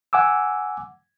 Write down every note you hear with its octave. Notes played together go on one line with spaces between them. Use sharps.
F#5 G#5 D6 E6